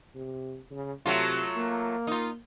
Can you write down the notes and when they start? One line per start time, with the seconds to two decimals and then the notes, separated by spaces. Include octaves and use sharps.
0.15 C3
0.71 C#3
1.06 C3 F#3 A3 F4
1.56 A#3
2.07 D#4 F4